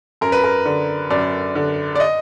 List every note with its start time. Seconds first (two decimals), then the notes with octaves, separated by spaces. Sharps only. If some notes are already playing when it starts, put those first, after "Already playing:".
0.21 F#2 A#4
0.32 B4
0.44 A#4
0.65 D3
1.10 F#2 D5
1.55 D3
1.95 D5
2.00 D#5